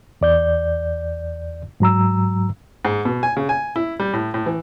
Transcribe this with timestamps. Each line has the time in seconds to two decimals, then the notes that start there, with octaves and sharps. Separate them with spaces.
0.21 E2 D5 G6
1.80 G#2 F#3 A#5 E6
2.85 G#2
3.05 B2
3.23 G#5
3.37 C#3
3.49 G#5
3.76 E4
4.00 G3
4.13 A2
4.34 A2
4.46 E3